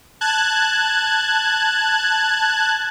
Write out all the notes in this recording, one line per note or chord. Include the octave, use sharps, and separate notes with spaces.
A5 F#6 G#6